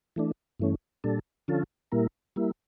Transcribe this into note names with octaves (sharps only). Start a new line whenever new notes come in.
E3 A3 D4
G2 E3 A3 C#4
A#2 G3 D4 A4
D3 F3 C#4 F4 A4
A#2 G3 A#3 E4 A#4
G3 A#3 E4